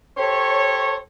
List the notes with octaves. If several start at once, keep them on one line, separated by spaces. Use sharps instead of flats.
G4 A4 C5 C#5